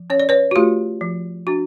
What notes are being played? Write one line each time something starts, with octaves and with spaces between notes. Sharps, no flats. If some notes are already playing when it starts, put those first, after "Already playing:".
Already playing: F3
C#4 C#5
D5
B4 C#5
F#4
A3 F4 G4
F3
D4 F#4